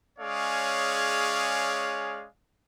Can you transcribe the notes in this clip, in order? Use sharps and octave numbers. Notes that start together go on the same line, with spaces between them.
G#3 C#4 G#4 C#5 D5 F5